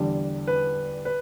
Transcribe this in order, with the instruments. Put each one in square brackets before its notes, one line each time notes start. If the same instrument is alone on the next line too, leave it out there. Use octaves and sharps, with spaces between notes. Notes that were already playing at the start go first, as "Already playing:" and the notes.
Already playing: [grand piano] E2 D3 G3
B4
B4